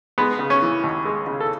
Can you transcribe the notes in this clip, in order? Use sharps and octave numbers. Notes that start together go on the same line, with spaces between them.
G#3 B3
C#3
C#4
E3
D#2
G#3
C#3
A4